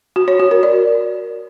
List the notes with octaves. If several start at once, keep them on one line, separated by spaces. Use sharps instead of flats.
F#4
C#5
F#4
A#4
D5